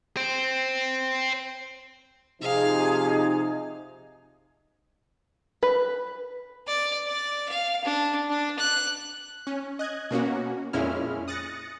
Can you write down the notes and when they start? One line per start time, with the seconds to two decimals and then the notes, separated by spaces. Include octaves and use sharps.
0.17 C5 G5
2.41 C3 F3 D#4 G#4 F5
5.63 B4
6.68 D5
7.06 D5
7.49 F5
7.84 D4
8.30 D4
8.59 F#6
9.47 C#4
9.79 D#5 F#6 G#6
10.11 B2 A#3 C#4 F#4
10.73 F2 A#2 G#3 C#4 E4 F6
11.28 D#6 F#6 A6 A#6 C#7